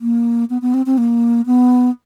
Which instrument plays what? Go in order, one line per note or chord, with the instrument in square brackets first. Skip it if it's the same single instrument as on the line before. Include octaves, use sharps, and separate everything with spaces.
[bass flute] A#3
B3
B3
C4
C4
A#3
B3